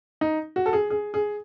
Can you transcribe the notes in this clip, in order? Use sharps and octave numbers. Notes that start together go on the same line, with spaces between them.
D#4
F#4
A4
G#4
G#4
G#4